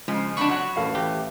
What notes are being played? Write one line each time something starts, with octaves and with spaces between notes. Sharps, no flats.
C#3 F3 G#3
F2 G#2 D4 B5 C#6
F#3 F#5
A1 A4 F5
E3 G4